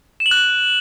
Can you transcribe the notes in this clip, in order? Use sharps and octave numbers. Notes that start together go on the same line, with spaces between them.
E7
F#7
F#6
F#7